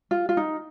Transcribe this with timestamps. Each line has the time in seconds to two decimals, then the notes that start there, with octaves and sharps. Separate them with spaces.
0.11 F4
0.29 F4
0.37 D#4